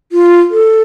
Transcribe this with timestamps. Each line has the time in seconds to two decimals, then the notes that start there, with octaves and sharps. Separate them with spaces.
0.12 F4
0.51 A4